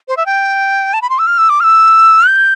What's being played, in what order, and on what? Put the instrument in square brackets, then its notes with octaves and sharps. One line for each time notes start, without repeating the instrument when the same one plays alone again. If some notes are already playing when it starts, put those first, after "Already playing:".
[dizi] C5
E5
G5
A5
B5
C6
E6
F6
E6
D6
F6
E6
G6